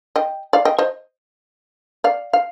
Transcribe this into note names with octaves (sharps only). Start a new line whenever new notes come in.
D#5 G5
D5 F5
D#5 G5
C5 D#5
D5 F5
F5